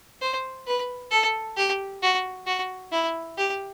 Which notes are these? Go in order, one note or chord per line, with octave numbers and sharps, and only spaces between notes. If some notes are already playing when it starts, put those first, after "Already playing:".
C5
B4
A4
G4
F#4
F#4
E4
G4